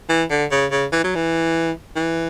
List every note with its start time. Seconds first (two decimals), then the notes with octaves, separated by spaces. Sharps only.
0.09 E3
0.30 D3
0.51 C#3
0.71 C#3
0.92 E3
1.04 F#3
1.15 E3
1.96 E3